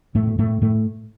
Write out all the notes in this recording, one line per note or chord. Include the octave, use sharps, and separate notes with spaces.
A2 A3
B2
A2 A3
A2 A3